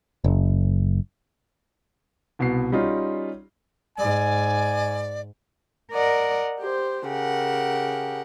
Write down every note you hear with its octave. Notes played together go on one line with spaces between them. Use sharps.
F#1
C2 B2 B3 C7
G3 C#4 D#4 F4 F#4
G#2 D5 G#5
A#4 D5 D#5 F#5
G4 C5
C#3 G4 A#4 F#5